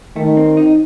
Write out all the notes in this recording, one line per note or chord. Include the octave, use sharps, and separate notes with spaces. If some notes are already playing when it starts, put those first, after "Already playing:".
D#3 A3
C4
D#4